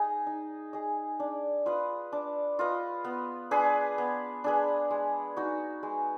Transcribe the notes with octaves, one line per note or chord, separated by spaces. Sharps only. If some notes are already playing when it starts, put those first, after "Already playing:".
Already playing: D#4 G#4 D#5
D#4
G#4 D#5
D4
F4 B4 D#5
D4
F4 B4 D#5
B3
D4 G#4 B4
B3
D4 G#4 B4
G#3
D#4 F#4
G#3